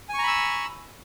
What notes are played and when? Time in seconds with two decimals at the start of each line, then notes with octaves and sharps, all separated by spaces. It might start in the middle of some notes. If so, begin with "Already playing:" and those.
0.09 G#5
0.14 C#6
0.18 A#5
0.23 B5
0.28 E6